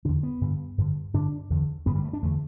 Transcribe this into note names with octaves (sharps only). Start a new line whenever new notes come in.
E2 D3 D4
B3
G2 D3
G2 D3
G2 D3 D4
E2 D3
G2 D3 B3
G3
A3
D4
E2 D3 A3